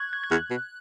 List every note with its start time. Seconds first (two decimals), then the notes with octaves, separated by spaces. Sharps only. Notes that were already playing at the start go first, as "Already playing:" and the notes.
Already playing: C#6 F#6 G#6
0.13 G#6
0.24 G#6
0.31 E2 F#6
0.50 B2